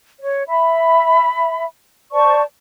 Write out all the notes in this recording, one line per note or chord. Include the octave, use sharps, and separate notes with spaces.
C#5
E5 B5
C5 D5 A5 C#6